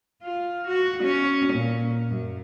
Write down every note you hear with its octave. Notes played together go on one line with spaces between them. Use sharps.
F4
F#4
C#4
A#2
F#2